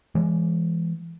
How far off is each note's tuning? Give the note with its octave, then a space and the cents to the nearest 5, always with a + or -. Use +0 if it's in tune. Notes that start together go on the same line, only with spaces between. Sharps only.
E3 +30 G#3 +0